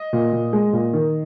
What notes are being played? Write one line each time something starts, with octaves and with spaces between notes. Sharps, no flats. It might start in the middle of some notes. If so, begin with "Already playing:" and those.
Already playing: D#5
A#2
A#2
G#3
A#2
D#3